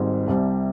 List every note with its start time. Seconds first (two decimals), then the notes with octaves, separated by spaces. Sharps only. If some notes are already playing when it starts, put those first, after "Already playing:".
Already playing: G#1 G#2 G3
0.27 C2 C3 G3